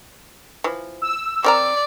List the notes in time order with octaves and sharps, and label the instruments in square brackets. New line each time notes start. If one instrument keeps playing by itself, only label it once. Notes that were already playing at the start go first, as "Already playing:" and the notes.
[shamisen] E3 F3
[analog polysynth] E6
[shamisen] C4 A#4 A#5 [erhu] D5